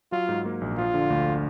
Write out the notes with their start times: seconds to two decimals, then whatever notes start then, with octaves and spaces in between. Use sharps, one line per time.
0.12 F#3 F4
0.29 G#2
0.45 A#3
0.61 A#1
0.78 F3 F4
0.94 D3
1.10 D2